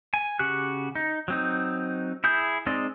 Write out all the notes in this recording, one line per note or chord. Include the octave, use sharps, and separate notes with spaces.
G#5
C#3 F#4 G4 F#6
D#4
F#3 C4 D#4
E4 G#4 G6
G#3 C4 D#4 D5 D#5